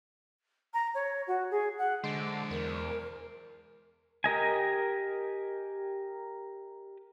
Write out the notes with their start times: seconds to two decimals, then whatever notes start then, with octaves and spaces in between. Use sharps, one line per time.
0.73 A#5
0.94 C#5
1.27 F#4
1.51 G#4
1.78 F#5
2.04 D3 G#3 C5 D5
2.51 E2 A#4
4.24 G4 A#4 D#5 G#5